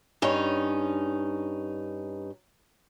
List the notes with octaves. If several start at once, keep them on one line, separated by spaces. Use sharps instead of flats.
G2 C#4 D#4